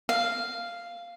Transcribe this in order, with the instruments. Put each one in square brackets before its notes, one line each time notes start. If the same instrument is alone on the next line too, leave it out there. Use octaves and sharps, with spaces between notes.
[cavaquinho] F5